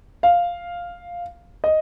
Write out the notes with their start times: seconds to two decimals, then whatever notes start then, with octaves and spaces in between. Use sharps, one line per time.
0.23 F5
1.64 D#5